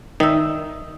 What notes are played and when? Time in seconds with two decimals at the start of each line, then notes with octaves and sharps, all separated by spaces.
0.20 D#3 D#4 E5